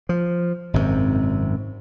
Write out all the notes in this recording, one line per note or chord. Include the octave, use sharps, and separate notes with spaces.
F3
G#1 F#2 A2 C3